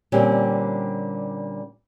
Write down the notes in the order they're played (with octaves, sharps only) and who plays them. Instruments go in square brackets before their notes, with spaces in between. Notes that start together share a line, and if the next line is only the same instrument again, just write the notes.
[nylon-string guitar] A#2 D3 G3 C4 C#4